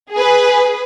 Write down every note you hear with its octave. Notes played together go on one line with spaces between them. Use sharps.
G#4 B4